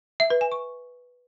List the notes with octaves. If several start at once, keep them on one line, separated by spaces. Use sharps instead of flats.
E5
B4
G#5
C#6